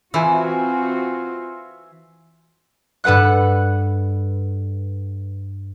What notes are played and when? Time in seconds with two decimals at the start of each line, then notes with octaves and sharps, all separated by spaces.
0.14 E3 C4 F4 F#4 E5 G#5
3.04 G2 A4 B4 F#5 F#6